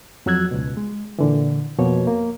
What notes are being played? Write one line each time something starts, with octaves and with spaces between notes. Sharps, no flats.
F2 F#3 F#4 E6 F#6 G#6
C#2 B2
G#3
A#2 D3 E3
F2 B2 F3 A#3 C#5
A#3